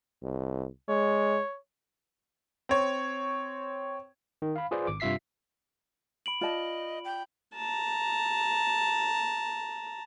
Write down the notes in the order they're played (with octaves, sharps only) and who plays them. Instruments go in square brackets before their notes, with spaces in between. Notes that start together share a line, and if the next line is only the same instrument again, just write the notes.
[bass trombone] C2
[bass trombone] G#3 [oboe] C#5
[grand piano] C4 C#5
[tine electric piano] D#3
F5 B5
F4 G#4 B4 C5 D5
G#1 D6
G2 C3 F4 E5 B6 C7
[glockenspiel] B5 D7 F#7
[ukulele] F4 D5 A5 [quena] D#5
[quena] G5
[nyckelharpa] A5 A#5